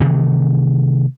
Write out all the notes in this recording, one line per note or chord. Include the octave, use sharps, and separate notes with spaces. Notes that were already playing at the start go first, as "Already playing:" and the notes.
C3 D#3 E3 A3